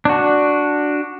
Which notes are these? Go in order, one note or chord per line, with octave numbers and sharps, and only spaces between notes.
D4 F#4